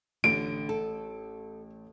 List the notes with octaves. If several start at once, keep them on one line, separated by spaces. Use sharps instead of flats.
A1 D3 D7
A4